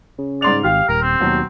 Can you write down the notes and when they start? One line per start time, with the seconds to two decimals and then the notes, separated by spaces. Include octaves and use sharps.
0.18 C#3
0.42 G#2 D5 C6 F7
0.64 G#1 G4 F5
0.89 D#1 A#4
1.02 C4
1.20 D#2 B2 F#3 F#5